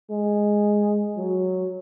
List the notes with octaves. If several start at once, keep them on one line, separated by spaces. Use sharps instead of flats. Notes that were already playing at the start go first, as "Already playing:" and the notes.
G#3
F#3